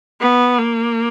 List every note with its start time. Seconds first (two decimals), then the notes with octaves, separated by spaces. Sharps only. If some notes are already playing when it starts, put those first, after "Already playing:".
0.20 B3
0.59 A#3